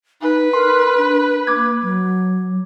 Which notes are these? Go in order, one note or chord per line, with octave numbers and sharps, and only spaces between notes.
D#4 B4
A#4 C6
D4
A#3 D6 G#6
F#3